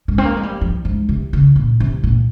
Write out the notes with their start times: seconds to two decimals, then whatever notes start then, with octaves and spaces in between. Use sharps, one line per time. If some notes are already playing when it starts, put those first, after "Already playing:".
0.08 G#3
0.18 C4
0.25 A#3
0.37 G#3
0.43 G3
0.61 F3
0.85 G#2
1.09 C3
1.33 C#3
1.56 A#2
1.80 C3
2.04 A#2